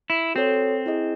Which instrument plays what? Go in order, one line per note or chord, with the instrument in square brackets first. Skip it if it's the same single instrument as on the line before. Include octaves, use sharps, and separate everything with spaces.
[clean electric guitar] E4
[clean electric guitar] C4 [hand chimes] F#4 A4 C#5
[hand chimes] E4 G#4 D#5